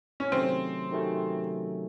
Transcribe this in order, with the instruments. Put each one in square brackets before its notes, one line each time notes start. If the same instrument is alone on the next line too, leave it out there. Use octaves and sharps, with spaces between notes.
[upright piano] C#4
[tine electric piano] C3 D#3 F#3 A3 C#4 [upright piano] C4
[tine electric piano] C3 D#3 F#3 A3 C#4